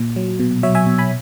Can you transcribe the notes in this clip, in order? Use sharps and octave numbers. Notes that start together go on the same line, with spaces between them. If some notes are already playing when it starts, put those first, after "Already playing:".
Already playing: A#2
F#3
B2
F#3 C#5 E5
E5 G#5
B2
G#5 B5